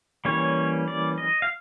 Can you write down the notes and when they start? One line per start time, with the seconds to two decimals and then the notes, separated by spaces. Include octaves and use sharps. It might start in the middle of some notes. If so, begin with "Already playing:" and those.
0.25 E3 G3 A#3 C#4 C#5
0.88 D5
1.18 D#5
1.42 F5